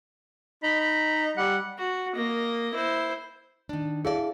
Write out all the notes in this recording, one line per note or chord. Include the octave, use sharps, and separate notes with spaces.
D#4 B5
B5
G3 F#5
F#4
A#3 D#5
E4 C5
D#3 D4
E4 G#4 A4 D5 F5